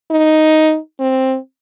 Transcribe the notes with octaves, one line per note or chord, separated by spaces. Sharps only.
D#4
C4